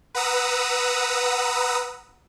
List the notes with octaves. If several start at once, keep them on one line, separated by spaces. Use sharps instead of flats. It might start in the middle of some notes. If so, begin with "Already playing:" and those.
B4 F#5 A#5 D#6 E6